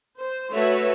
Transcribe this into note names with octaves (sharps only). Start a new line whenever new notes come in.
C5
A3 F#4 B4 C#5 E5